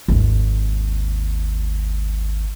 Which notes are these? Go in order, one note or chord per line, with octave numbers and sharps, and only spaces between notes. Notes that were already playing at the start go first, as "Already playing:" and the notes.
G#1 D#2